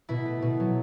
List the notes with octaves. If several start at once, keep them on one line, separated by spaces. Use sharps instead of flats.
B2 E4
A3
B2
F#3